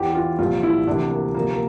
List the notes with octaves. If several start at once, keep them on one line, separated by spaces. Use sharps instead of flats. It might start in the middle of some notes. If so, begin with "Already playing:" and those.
Already playing: E2 E3 G4
G4
F4
C2 A#2 F3 F4
E4
D2 C3 E3 D4
A#3
D2 C3 F3 A#3
A#3